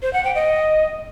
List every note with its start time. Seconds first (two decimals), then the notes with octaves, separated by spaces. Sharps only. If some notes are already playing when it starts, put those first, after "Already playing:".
0.03 C5
0.13 F#5
0.24 G5
0.35 D#5